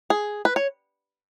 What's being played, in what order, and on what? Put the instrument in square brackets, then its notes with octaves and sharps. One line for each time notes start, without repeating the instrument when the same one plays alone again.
[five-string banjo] G#4
B4
C#5